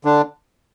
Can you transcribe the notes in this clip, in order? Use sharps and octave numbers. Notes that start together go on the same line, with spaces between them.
D3 D4